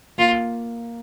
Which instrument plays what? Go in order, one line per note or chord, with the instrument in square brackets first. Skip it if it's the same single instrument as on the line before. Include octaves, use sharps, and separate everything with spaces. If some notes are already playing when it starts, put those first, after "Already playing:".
[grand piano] A#3 [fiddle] F4